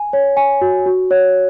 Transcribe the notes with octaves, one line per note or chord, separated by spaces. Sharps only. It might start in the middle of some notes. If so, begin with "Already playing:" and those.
Already playing: G#5
C#5
G#5
F#4
F#4
C#5